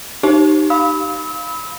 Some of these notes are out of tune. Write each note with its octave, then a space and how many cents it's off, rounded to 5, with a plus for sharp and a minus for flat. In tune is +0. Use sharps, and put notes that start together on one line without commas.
D#4 -20 G4 -25
F5 +0 B5 +0 E6 -35